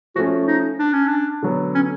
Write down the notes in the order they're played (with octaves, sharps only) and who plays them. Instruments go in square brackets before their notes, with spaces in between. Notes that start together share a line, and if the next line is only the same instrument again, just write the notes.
[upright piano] F3 A3 C#4 [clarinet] F#4
[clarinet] D#4
D4
C#4
D4
[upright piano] D3 F#3 B3
[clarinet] C#4